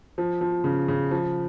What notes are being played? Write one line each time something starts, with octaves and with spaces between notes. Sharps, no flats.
F3
F3
C#3
C#3
F3